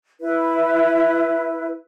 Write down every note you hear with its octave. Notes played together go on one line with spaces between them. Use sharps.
E4 B4